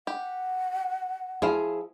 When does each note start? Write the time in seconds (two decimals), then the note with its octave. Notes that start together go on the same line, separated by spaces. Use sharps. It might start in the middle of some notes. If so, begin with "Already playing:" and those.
0.07 G4 F#5
1.42 F3 E4 G#4 F5